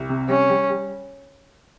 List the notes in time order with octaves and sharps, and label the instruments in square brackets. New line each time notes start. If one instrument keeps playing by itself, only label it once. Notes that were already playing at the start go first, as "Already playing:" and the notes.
Already playing: [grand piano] C2
C3
[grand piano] G3 [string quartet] C#4
[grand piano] G3
G3